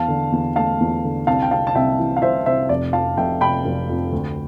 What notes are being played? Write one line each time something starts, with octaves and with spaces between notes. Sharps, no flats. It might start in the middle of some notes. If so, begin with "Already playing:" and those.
Already playing: E2 F5 A5
D3
E2
A3 F5 A5
E2
D3
C2 F5 A5
G5
C3 F5 A5
A5
C2 E5 G5
E3
F5
C2 C5 E5
C3 C5 E5
F1 D5
F2 F5 A5
F1 E5 G5
C3 G5 B5
F1
F2
D2